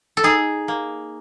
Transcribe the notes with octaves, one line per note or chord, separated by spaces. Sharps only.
A4
D#4 G#4
A#3